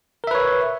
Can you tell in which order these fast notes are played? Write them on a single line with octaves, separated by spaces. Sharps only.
A#4 E5 B4 C#5